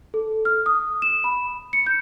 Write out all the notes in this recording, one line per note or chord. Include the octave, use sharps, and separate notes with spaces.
A4
F6
D#6
E7
B5
C#7
G6